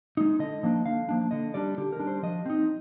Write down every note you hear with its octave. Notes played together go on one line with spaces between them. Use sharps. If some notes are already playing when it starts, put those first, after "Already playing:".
G#3 D#4
D3 D#5
F3 A#3 D4
D3 F5
F3 A#3 D4
D3 D#5
G3 D4 D5
D3 G4
A#4
G3 D4
C5
F3 D#5
C4 D#4